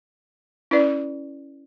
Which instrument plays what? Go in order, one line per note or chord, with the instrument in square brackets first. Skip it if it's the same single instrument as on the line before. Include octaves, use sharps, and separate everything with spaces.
[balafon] C#4 E4 B4 D5